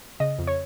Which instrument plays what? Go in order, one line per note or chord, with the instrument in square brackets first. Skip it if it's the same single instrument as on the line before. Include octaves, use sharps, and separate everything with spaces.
[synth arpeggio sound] C#3 D#5
F2
C#5